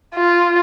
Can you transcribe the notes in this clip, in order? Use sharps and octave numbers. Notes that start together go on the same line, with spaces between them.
F4